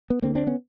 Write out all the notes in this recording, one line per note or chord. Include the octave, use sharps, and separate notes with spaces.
B3
D2 D3 A#3 C4
C4 D4
B3 C#4